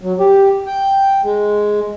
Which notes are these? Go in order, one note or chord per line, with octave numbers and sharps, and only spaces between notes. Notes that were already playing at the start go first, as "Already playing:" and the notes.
F#3
G4
G5
G#3